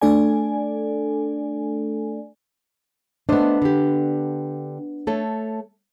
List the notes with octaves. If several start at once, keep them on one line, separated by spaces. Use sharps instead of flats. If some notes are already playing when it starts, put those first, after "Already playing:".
A3 D4 A4 D5 G#5
A3 B3 D4 C5 D#5
D3 G4
A3 A4 C#5